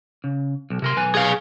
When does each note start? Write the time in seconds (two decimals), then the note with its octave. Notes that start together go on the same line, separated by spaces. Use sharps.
0.24 C#3
0.70 B1
0.82 C3 A#4 C6
0.97 B1 B4 G#5
1.15 G#4 F5